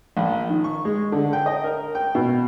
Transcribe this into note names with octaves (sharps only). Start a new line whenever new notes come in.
A#1
D#3
C#6
G#3
D3
G5
D#5
A#4
G5
B2